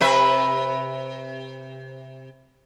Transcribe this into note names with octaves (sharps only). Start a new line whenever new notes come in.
C3 B4 E5